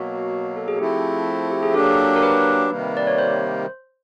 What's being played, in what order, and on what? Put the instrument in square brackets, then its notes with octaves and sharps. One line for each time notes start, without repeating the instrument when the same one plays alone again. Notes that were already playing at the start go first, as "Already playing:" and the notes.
Already playing: [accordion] B2 F#3 A#3 [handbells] F#4
[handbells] A4
G#4
[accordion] F3 A3 C4 E4 [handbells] G4
[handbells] G#4
G4
G#4
[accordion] F#3 A#3 D4 G4 [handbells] A4
[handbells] A#4
B4
[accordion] C3 D#3 G3 A#3
[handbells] D5
C#5
C5